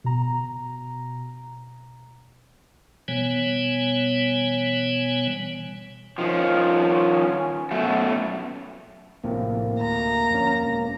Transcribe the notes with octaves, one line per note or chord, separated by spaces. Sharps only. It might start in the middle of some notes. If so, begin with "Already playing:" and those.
B2 A#5
B2 E3 G3 B3 C#5 G#5
D#3 F3 C#4
F#2 B2 A3
A#1 A2 C3 A#3
D2 A#5
F2 C#4
E1